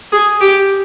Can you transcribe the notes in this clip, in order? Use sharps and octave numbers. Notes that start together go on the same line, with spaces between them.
G#4
G4